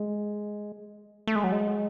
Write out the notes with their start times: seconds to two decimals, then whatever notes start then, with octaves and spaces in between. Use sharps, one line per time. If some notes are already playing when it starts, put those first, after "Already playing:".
Already playing: G#3
1.27 A3
1.36 G#3
1.44 F#3
1.52 G#3